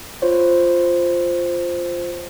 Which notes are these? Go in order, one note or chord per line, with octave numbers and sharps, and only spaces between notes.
F4 C5 C#5